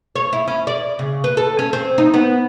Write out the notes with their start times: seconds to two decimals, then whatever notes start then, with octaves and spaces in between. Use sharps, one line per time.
0.15 C#5
0.33 E4
0.48 C#4
0.67 D5
0.99 C#3
1.24 B4
1.37 A4
1.59 C#4
1.73 C4
1.98 D#4
2.14 B3